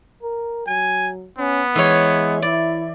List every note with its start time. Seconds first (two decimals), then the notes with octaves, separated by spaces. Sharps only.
0.22 A#4
0.67 F#3 G#5
1.38 B3 C#4
1.75 E3 G#3 C#5
2.42 E4 D5